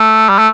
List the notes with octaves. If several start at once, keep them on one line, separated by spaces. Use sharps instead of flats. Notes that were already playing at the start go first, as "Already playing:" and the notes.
Already playing: A3
G3
A3